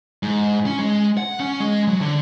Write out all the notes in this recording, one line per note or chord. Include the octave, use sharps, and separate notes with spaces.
G#2
C#4
G#3
F#5
C#4
G#3
F#3
D3